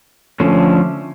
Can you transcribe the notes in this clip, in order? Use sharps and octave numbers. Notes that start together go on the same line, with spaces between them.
D3 F3 A3 C#4